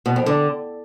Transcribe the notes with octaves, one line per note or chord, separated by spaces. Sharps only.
B2
F2
D3